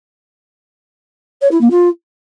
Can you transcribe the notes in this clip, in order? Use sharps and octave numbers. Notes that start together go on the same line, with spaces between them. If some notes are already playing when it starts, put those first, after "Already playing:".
C#5
E4
A#3
F4